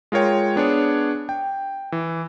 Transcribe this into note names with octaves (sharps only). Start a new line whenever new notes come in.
G#3 F4 A#4 C#5 G5
B3 D4 G#4 C#5
G5
E3